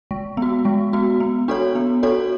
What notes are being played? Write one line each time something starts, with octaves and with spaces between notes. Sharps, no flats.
G#3
B3 F#4
G#3
B3 F#4
B3
D4 F#4 A4 C#5
B3
D4 F#4 A4 C#5